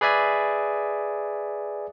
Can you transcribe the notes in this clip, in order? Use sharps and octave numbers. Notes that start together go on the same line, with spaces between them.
G#4 B4 D5 E5 G#5